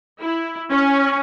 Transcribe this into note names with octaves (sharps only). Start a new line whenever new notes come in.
E4
C#4